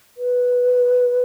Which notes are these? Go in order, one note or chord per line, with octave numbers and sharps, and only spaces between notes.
B4